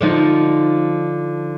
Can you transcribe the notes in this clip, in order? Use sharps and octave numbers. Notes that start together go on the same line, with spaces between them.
D3 F3 D#4